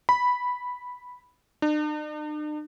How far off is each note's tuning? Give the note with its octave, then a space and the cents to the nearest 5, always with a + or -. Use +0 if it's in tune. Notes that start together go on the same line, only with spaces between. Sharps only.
B5 -5
D4 +45